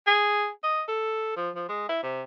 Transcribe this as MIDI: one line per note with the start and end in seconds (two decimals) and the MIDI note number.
0.07 0.48 68
0.64 0.82 75
0.88 1.33 69
1.36 1.50 53
1.56 1.65 53
1.69 1.88 56
1.89 2.00 64
2.03 2.22 48